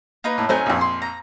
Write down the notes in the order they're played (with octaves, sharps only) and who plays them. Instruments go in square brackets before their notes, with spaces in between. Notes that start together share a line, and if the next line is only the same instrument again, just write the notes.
[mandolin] A#3 D#4 B4
[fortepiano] A2
[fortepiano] F#3 A3 C4 [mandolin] C#4 D#4 G#5
[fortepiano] A#1 F2
[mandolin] C6
A#5